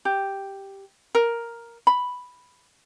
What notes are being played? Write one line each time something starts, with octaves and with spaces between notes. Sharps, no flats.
G4
A#4
B5